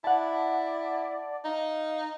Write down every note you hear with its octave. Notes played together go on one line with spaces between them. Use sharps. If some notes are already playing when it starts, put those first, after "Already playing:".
E4 D5 F#5 A5
D#4 F5